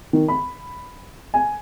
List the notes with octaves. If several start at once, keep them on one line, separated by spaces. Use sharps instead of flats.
D#3
B5
G#5